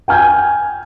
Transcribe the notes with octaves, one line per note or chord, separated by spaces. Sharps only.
G5 G#5 F6 G6 G#6